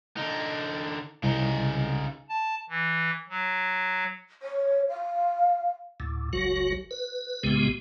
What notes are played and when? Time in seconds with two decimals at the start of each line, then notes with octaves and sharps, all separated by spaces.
0.17 D3 D#4
1.23 C2 C#3 D#4
2.29 A5
2.70 E3
3.29 F#3
4.42 C#5
4.89 F5
6.00 D2 A2
6.33 F#1 C#2 F#3 F#4
6.91 B4
7.43 C2 A2 C#3 G#3 B3 G4